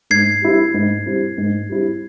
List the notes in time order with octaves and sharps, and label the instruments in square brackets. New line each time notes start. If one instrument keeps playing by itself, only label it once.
[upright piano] G#2 [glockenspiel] G#6 C7
[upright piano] G3 C4 E4
G#2
G3 C4 E4
G#2
G3 C4 E4